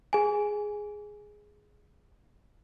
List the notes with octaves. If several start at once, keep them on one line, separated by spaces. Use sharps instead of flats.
G#4 G#5